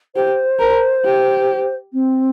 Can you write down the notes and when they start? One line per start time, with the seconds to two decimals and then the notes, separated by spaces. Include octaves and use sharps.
0.15 G4 C5
0.59 A#4
1.04 G4
1.93 C4